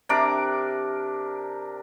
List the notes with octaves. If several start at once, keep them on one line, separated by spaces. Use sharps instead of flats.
C3 D4 A#4 D6